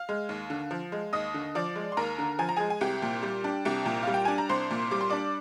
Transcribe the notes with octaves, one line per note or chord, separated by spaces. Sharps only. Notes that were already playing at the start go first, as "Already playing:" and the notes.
Already playing: F5 F6
G#3
D#2
D3
F3
G#3
D#2 D#5 D#6
D3
F3 D5 D6
G#3
C6
D#2 A#4 A#5
D3
F3 G#5
A#5
G#3 G#4 G#5
G#5
C2 G4 G5
A#2
G3
D4
C2 G4 G5
A#2
G3 F5
G5
D4 G#5
A#5
C2 C5 C6
A#2
G3 D6
C6
D4 D5 D6